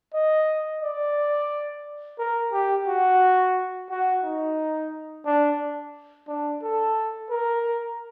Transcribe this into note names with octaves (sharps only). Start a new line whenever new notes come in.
D#5
D5
A#4
G4
F#4
F#4
D#4
D4
D4
A4
A#4